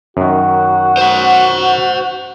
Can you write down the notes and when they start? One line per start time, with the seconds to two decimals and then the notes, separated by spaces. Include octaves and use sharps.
0.17 F#2 D#3 F#4
0.97 C5 F#5